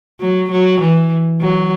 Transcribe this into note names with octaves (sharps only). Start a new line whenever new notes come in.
F#3
F#3
E3
F#3